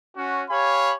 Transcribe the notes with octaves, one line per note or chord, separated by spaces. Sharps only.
C#4 F#4
G4 C#5 F5 G#5 B5